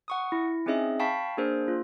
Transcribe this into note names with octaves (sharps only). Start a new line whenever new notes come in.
F#5 C#6 D#6
E4
C4 C#4 D#4 G#4 D#5 E5
F5 G5 A5 B5 C#6 B6
A#3 D4 G#4 A#4 C5
A#3 F4